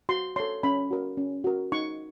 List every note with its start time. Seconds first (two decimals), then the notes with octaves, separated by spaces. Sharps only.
0.09 F#4 C6
0.36 A4 C#5 C6
0.63 C#4 B5
0.91 F#4 A#4
1.17 C#4
1.44 F#4 A#4
1.72 D#4 C#6